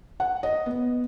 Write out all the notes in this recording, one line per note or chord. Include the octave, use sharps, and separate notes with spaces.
F#5
D#5
B3